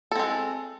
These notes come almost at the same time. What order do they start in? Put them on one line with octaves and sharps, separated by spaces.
A4 C4 G#3